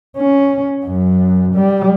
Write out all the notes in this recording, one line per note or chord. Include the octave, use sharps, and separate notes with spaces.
C#4
F#2
G3